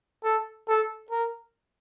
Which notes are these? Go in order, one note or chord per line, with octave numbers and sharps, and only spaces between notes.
A4
A4
A#4